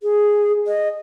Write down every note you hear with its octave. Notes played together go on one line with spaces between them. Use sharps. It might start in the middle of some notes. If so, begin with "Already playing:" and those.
G#4
D#5